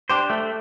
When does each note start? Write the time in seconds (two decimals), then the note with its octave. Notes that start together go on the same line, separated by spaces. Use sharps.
0.09 D4 G4 C5
0.30 A3